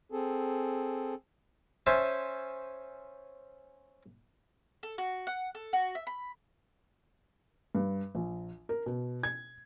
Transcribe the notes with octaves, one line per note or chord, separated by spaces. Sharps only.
C4 G#4 A4
C#4 C5 E5 G#5 A5
A4
F#4
F#5
A4
F#4
E5
B5
G2
A#1
A#4
B2
G#6